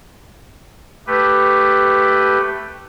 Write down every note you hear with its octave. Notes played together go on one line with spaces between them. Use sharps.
A3 G4 B4